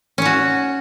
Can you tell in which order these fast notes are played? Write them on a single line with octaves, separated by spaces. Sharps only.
C#4 C#5 F#4